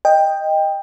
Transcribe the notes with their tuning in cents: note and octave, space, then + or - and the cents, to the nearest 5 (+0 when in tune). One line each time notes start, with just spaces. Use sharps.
D#5 +0 G5 +15